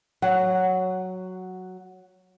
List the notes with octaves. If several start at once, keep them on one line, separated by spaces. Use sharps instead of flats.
F#3 F#5